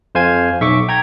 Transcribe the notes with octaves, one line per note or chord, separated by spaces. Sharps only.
F2 C5 F5 G#5 G#6
B1 E5 C#6 D6
G5 A#5 G#6